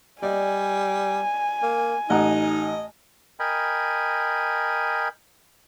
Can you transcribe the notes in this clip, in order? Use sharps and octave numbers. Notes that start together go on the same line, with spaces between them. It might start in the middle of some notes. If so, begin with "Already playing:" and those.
G3 D5 D#5 G#5
A#3
A1 D#4 D#5 F#5 A#5
A#4 D#5 G5 G#5 B5